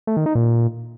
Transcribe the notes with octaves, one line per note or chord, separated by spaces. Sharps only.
A3
D#3
D#4
A#2